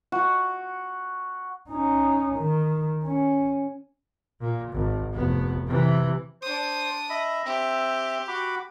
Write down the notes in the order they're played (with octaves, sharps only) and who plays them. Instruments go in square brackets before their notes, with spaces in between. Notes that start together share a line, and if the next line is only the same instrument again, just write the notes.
[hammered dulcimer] F#4
[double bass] C#4 D#4
D#3
C#4
A#2
G#1
F1 B3
C3 E3
[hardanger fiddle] D4 D#6 [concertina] C5
[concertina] D#5 E5 B5
[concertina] C4 E5 [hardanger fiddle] G4
[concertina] F#4 B5 D6